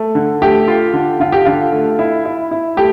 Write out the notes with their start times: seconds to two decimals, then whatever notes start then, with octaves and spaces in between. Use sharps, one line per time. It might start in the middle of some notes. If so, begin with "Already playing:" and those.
Already playing: A3
0.15 D3
0.42 A3 G4
0.68 F4
0.93 D3
1.20 D3 F4
1.32 G4
1.45 D3 F4
1.72 A3
1.99 E4
2.25 E4
2.51 E4
2.77 A3 G4